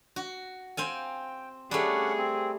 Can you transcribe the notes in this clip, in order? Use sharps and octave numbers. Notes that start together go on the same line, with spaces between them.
F#4
C4 F5 G5 G#5
G3 A3 C#4 D4 G#4 F#5
C4